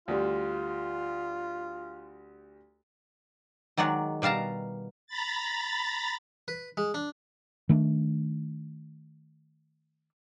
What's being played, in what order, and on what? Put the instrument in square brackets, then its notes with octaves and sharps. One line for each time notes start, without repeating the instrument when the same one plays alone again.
[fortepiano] D2 G3 [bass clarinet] F4
[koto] D#3 F#3 G#3 D5 F#5
B2 G3 F5 A5 A#5
[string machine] A#5 B5 A6
[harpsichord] B4
G#3
D4
[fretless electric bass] D#3 A3 D4